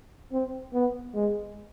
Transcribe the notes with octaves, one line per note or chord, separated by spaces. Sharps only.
C4
B3
G#3